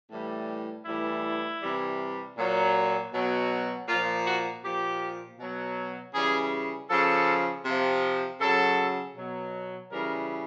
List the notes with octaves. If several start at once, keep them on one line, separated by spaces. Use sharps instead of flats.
A2 E3 G3
A2 E3 G3 E4
C3 E3 G3
A#2 F#3
B2 F#3
A#2 F3 F4
F#4
A#2 F3 G4
B2 F#3
C#3 E3 G3 G#4
C#3 F3 A4
C3 F3
C#3 F#3 A4
B2 F#3
C#3 E3 G3 A#4